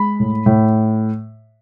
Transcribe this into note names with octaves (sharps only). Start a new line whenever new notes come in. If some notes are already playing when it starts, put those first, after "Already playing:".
Already playing: G#3 B5
A2
A2